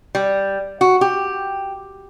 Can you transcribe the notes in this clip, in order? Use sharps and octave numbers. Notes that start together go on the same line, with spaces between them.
G3
F#4
G4